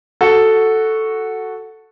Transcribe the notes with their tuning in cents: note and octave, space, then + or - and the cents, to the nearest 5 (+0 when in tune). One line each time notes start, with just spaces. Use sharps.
F#4 +0 A4 +0